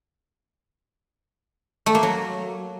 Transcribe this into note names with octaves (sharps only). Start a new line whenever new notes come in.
A3
A#3
F#3